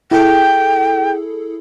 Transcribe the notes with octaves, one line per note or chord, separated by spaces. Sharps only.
E4 G#4 A4 G5